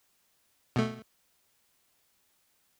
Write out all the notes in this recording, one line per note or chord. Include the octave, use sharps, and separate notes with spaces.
B2 A3